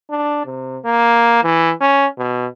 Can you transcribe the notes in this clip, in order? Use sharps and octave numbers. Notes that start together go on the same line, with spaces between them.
D4
C3
A#3
E3
C#4
B2